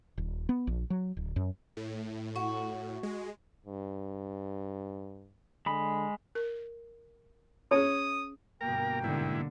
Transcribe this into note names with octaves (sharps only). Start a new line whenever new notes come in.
D#1
B3
A#1
F#3
D1
F#2
A2
F#4
G#3
G2
D3 G#3 B5
A#4
C#4 G#4 C#5 D#6
G1 B2 A#3 A#4 G5 A#5
G#2 D3 E4